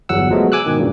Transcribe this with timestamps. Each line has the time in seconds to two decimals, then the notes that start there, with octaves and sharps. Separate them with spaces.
0.09 G1 E2 F#3 F#5 E6
0.30 F3 F#3 G#3 A3 B3
0.52 G#5 D6 E6 F#6
0.66 G#2 B2 D#3
0.79 G2 A#2 C#3